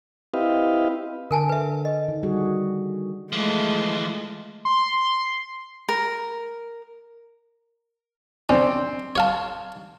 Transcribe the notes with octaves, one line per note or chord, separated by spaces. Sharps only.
C4 E4 G4 B4 D#5 F5
D3 A#4 G#5 A5
B4 E5
D#5
D#3
G3 F#4 G#4
E3 F3 G#3 A3
C6
A#4
C4 C#4 D5
C#5 F5 A5